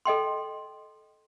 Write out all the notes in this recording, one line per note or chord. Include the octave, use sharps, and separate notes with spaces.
A4 D#5 G5 C6